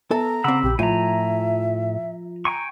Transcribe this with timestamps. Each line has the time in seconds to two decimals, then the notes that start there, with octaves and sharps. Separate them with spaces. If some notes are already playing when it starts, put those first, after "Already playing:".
0.11 B3 A4 E5 A5 A#5
0.44 C#3 C4 F#5 B5 D6 E6
0.63 A#1 G4
0.79 A2 F3 F4 E5 G#5 A#5
2.45 G5 G#5 A#5 C#6